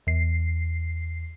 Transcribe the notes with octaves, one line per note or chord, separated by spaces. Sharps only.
E2 C7